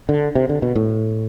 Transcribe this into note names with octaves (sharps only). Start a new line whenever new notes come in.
D3
C3
D3
B2
A2